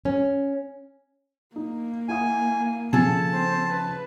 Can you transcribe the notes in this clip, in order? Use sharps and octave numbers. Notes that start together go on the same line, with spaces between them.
C#4
A#3 D#4
E4 F#5 G#5 D#6
C#3 F3 G#4 A4 A5 A6
C4 C5
B4